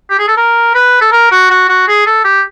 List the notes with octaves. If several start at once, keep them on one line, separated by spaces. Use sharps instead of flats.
G4
G#4
A4
A#4
B4
A4
A#4
F#4
F#4
F#4
G#4
A4
G4